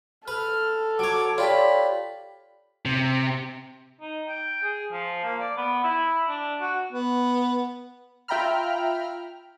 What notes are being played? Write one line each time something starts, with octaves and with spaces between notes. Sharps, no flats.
A4 B4 F6
F#3 C#5 D6
F4 G4 C#5 D5 B5
C3
D#4
G5
G#4
F3
A#3
D5
B3
E4
D4
F#4
B3
F4 E5 G5 A#5 B5 F6